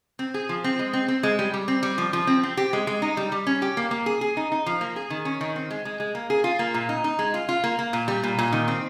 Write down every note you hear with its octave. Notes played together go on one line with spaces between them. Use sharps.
C4
G#4
F3
C4
G#3
C4
C4
G#3
G3
G3
C4
G3
F3
F3
C4
C4
G4
G#3
G#3
D#4
G3
G3
C#4
G4
A#3
A#3
G#4
G#4
D#4
D#4
F3
A#3
G#4
D#3
C#4
D#3
C4
G#3
G#3
G#3
A#3
G#4
F4
A#3
A#2
D#4
D#4
G#3
F4
F4
A#3
A#3
A#2
G3
A#2
A#2
D#3
C4